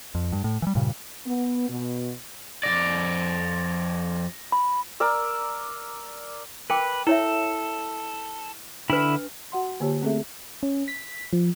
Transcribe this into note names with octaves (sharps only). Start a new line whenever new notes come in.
F2
G2
A2
E3 G3
G2 A#2 C#3
B3
B2
F2 C#3 D5 A#6
B5
A#4 D5 E6
A#4 B4 G5 D6
E4 A4 C#5 E5
D3 D4 E4 B4 B5
F#4 F#5 C6
D3 A#3 F4 G4 C#5 A5
A3 C4 C#4 G#4 A4 E5
C#4
B6
F3